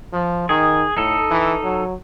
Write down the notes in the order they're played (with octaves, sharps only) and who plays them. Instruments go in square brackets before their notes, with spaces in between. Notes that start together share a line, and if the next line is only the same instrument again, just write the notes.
[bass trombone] F3
[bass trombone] D#3 [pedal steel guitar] G#4
[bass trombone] A2 [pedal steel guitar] D#4 A4
[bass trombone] E3
F#3